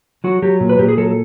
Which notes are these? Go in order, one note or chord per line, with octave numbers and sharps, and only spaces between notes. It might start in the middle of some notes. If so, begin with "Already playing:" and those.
F#3 F#4
F#3 G4
A#2
B4
A#2 G4
G#4
F#3 A4